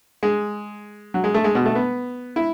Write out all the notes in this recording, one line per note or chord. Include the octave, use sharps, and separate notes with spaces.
G#3
F#3
G#3
A3
G#3
B2
A3
B3
E4